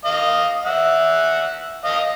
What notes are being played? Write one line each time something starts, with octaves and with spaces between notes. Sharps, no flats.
D#5 F5
E5 F#5
D#5 F5